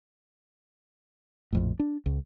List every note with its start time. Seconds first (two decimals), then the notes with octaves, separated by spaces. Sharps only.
1.53 A#1 F2 A2
1.79 D4
2.06 C#2